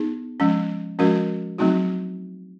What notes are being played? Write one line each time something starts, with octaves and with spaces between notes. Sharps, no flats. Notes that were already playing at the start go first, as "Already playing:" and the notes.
Already playing: B3 D#4 G#4
F3 G#3 C#4
F3 G#3 C#4 F#4 A#4
F#3 A3 C4 D#4 F#4